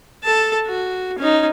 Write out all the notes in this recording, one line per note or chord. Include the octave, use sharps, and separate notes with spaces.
A4 A5
F#4
C#4 D#4